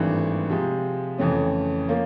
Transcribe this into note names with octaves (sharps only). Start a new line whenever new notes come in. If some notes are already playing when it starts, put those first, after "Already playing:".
Already playing: G#1 G2 E3 A3 C4
C3 F3 G#3
F2 C#3 E3 A3 C#4
F3 A#3 C#4